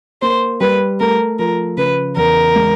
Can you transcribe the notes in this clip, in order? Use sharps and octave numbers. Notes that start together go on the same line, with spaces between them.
A#3 C5
G3 B4
A3 A#4
F3 A#4
C#3 B4
E2 A#4
G#3